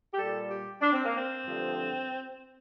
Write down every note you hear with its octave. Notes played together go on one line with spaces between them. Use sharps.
G4
A#2 G3 A4
G4
D4
C4
A#3
C4
G2 D3 F3 A3